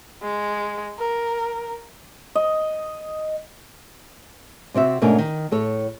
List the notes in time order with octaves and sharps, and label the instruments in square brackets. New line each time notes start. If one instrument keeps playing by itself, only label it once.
[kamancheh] G#3
A#4
[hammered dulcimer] D#5
[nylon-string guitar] C3 C4 F#4 E5
G#2 B2 A3 C#4 D4 A#4
D#3
A2 A4 C#5